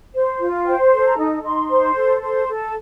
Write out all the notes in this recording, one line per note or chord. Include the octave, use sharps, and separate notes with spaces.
C5
F4
C5 G5
A4
A#5
D#4
D#4 C6
C5
A4
C5
A4